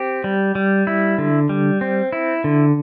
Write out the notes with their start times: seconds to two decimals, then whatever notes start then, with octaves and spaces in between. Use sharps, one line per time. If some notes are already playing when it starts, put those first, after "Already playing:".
Already playing: C4 G4
0.24 G3
0.55 G3
0.87 E4
1.18 D3
1.49 G3
1.81 C4
2.13 E4
2.44 D3